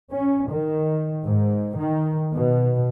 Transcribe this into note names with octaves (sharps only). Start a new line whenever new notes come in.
C#4
D#3
G#2
D#3
B2